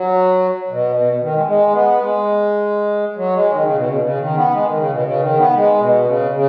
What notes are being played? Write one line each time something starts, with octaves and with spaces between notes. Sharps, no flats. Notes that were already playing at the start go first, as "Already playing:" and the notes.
Already playing: F#3
B2
B2
D#3
G#3
G#3
B3
G#3
F#3
G#3
D#3
C#3
B2
C#3
C#3
D#3
B3
G#3
D#3
C#3
B2
C#3
D#3
B3
G#3
B2
C#3
C#3